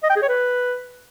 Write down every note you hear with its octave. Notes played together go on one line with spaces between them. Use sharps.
D#5
G5
G#4
C#5
B4